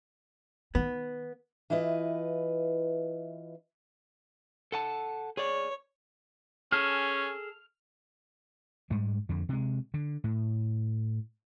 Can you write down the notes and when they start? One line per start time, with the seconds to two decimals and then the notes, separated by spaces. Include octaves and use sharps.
0.75 D#3 B3
1.70 E3 E4 F4 B4 D#5
4.72 A4 F#5 A5
5.37 G#4 C#5 D5
6.72 C#4 G#4 A4 F6
8.90 G#2 G3 G#3
9.29 F2 D3
9.49 C3 G#3
9.94 D3
10.24 A2